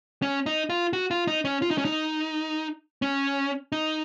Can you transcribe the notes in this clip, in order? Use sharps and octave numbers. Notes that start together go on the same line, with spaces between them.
C#4
D#4
F4
F#4
F4
D#4
C#4
F4
D#4
C#4
D#4
C#4
D#4